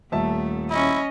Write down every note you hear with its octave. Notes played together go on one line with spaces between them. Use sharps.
D#1 A3 E5 A5
C#4 E4 D#5